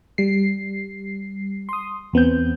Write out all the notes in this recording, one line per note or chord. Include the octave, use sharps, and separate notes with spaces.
G3 C7
C6 D#6
E2 B3 C4 G6